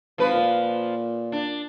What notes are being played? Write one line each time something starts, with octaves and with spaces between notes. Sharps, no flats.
G#1 F3 B4
A#2
D4